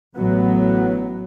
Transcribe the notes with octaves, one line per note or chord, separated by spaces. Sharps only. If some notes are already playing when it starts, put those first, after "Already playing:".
A1 A2 F#3 B3